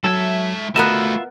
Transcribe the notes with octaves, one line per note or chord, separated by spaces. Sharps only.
G#2 F#3 A4 E5 G#6
A3 B3 F4 F#4 A#4 D#5 E5 B5